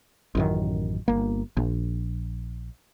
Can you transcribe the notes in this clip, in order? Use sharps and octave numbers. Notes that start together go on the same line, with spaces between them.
A1 F#2 D#3
G1 A#3
A#1